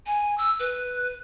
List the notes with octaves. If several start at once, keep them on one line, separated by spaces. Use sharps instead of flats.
G#5
E6
B4